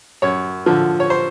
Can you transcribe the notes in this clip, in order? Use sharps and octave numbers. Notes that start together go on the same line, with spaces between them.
F#2 C#5
D3 F3
C#5
C5